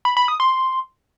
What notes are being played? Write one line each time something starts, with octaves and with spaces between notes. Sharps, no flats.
B5
B5
D#6
C6